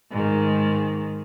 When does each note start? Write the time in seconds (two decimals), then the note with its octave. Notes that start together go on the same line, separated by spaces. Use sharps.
0.11 G#2 D#3